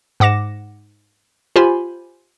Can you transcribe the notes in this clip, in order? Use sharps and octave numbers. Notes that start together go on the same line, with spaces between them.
G#2 F#5 D6 A#6 E7
F4 G4 C5 G#5 B5 C6